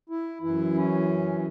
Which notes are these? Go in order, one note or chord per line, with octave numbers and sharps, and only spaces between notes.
E4
F#2 E3 E4
C#4